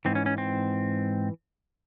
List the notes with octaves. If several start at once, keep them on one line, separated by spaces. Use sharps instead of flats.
G#2 E3 C4
C#4
C#4
C4